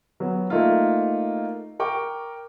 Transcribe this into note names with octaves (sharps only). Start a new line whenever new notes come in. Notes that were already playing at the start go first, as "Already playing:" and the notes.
F#3 B3
A3 A#3 D#4 F4
A#4 G5 C#6 D6